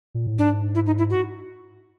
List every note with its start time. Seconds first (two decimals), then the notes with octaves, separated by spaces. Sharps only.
0.15 A#2
0.27 A2
0.39 G#2 D4
0.75 E4
0.86 D#4
0.98 E4
1.10 F#4